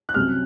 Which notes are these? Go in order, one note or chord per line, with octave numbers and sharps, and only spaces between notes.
F#6
C2 C3 F#3 C#4 F6